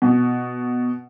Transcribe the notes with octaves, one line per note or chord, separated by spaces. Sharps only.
B2